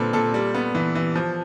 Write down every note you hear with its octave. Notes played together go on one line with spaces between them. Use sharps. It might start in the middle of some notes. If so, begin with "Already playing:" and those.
Already playing: A#2 D3 G3 C4 A4 B4
A#2 A4
G3
B3
E3
E3
F3